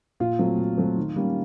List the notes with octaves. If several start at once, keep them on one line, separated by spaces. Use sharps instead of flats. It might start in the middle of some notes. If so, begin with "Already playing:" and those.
A#2 F4
F#3 A3 C4
A#2
F#3 A3 C4
D#3
G3 A#3 C#4